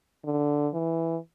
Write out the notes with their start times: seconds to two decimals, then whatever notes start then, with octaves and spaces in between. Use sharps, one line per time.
0.24 D3
0.74 E3